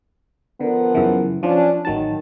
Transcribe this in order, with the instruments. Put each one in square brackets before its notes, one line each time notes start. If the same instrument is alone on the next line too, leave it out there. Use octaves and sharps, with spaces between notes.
[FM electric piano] D3 [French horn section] F3 B3 A#4
[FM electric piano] F#2 C#3 E3
[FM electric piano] F3 [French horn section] C#4 D4
[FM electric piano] A1 F#3 A5 [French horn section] D#3